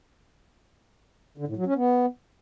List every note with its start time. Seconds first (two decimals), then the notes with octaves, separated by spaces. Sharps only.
1.38 D3
1.47 A2
1.57 F#3
1.66 C#4
1.76 B3